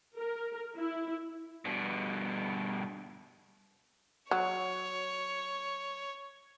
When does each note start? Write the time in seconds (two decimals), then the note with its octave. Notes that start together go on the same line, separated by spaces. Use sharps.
0.15 A#4
0.76 E4
1.65 G2 B2
4.31 F#3 C#5